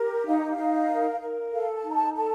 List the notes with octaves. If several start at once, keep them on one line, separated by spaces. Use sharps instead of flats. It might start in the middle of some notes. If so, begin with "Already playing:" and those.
Already playing: G4 A#4
D#4 F5
D#5
F5
D#4
A#4
A#4
A4 F5
A5
D#4
A#5
A5
A4 A5